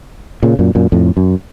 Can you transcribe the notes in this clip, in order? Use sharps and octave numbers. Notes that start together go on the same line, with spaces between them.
A#2 C#3
F#2 A#2
F#2 A#2
F2 A2
F#2